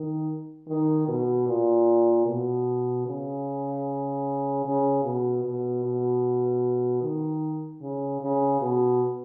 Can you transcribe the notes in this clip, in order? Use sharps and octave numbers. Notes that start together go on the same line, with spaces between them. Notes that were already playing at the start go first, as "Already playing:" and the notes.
Already playing: D#3
D#3
B2
A#2
B2
C#3
C#3
B2
B2
B2
D#3
C#3
C#3
B2